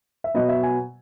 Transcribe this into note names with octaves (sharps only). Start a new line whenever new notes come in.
E5
B2 F#3 B3 D#5
E5
G#5